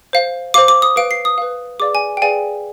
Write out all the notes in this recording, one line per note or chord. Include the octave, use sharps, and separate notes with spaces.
C5 F5
C5 F5 D6
D6
D#6
B4 F5 D7
C7
D#6
B4 F5
G#4 B4 D5 F5 D6
G#5
G5
G#4 B4 D5 F5 G#5